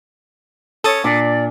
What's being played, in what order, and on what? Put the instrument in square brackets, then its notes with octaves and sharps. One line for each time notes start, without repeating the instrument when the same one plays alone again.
[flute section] C#4 C#5 G#6 [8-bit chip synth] A4 D#6 A6
[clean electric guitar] A#2 [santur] D4 [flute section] D5